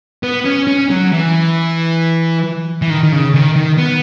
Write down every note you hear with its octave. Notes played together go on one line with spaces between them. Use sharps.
B3
C#4
C#4
F#3
E3
E3
D#3
D#3
C#3
D#3
D#3
B3